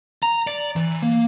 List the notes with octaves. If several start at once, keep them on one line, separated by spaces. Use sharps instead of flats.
A#5
D5
E3
A#3